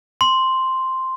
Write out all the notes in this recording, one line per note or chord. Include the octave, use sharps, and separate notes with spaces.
C6